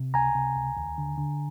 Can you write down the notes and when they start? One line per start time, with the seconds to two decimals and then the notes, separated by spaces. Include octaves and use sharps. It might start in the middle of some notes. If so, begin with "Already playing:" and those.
Already playing: C3
0.14 C#2 G#5 A#5
0.35 C3
0.55 C#2
0.77 D#2
0.98 D3
1.18 D3